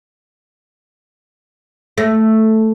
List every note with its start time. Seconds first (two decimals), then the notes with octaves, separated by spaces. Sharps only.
1.98 A3